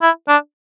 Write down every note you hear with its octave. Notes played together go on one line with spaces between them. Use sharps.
E4
D4